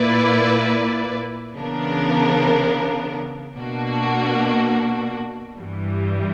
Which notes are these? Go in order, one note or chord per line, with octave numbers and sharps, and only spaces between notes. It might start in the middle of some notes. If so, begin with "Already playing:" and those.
Already playing: A#2 A#3 E4 B4 D5
C#3 E3 B3 D4 A#4
B2 A#3 D4 F#4
G2 E3 G3